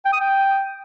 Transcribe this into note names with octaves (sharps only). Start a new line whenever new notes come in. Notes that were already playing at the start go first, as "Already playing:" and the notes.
G5
D#6
G5